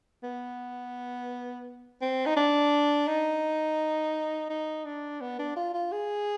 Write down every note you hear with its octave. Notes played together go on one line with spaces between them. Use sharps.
B3
C4
D#4
D4
D#4
D#4
D4
B3
D4
F4
F4
G#4